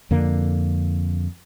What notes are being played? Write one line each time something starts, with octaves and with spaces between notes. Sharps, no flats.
F2 D3 A#3